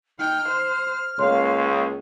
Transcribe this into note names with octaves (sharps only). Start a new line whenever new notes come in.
D#4 G5 F6
C5
C#2 A#3 C#5 F5 C6